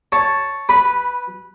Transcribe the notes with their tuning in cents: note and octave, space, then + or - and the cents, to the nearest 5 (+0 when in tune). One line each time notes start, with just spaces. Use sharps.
C#5 +0 A5 +0
B4 +0 B5 -15